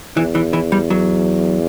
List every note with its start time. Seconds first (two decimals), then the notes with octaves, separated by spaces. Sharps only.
0.17 E2 E3
0.35 E3
0.53 E3
0.72 G3
0.90 F#3